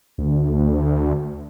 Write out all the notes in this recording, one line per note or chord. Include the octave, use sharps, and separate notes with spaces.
D2